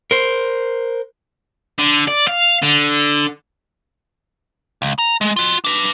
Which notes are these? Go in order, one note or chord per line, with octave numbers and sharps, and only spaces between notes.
A#4 C5
D3
D5
F5
D3
C#2
A#5
G#3
F4 F#4
D4 B4